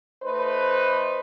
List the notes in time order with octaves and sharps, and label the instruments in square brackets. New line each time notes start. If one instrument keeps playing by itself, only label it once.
[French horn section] A3 D#4 B4 [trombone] C5